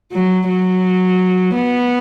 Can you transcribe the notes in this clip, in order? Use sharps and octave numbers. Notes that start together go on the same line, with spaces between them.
F#3
F#3
B3